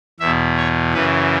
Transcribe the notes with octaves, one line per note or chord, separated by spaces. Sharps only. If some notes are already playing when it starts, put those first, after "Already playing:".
E2 B2 E5
C#5
F#2 C#3 E3 B4